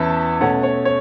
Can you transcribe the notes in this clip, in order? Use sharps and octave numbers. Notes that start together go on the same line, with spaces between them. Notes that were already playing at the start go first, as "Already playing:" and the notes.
Already playing: E2 E3 C#4 E4 E5 A5
B2 A3 C#4 C#5 F#5
C#5
C#5